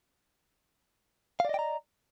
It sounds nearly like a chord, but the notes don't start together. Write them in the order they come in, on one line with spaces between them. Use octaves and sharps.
F5 D5 D#5 G5 A#5